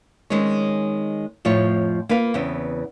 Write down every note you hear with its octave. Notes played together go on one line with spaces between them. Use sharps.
D#3 G#3 C4 C#4 C#5
F2 A2 F3 F4 C#5
A#3 F4 B4 F5
E2 C#3 B3 C4